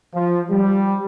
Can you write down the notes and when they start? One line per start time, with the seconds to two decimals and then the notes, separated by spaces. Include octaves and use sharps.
0.14 F3
0.51 G3